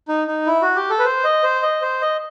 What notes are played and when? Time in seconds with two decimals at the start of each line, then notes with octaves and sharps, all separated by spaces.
0.08 D#4
0.28 D#4
0.47 E4
0.62 F#4
0.76 G4
0.90 A4
0.99 B4
1.05 C5
1.24 D#5
1.44 C5
1.63 D#5
1.82 C5
2.01 D#5